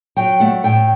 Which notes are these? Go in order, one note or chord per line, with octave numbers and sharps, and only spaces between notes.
F#3 G5
A3 F#5
A2 G5